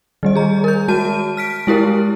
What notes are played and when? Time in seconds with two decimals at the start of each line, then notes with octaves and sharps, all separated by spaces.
0.23 D#3 G3 D#5
0.35 G#4 A#5
0.64 A#4 G6
0.88 G#3 F#4 A5 D#7
1.37 F6 B6 D7
1.67 G#3 E4 G4 A#4